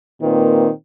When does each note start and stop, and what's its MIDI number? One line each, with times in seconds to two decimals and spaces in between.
0.21 0.68 46
0.21 0.68 51
0.21 0.68 58
0.21 0.68 60
0.21 0.68 71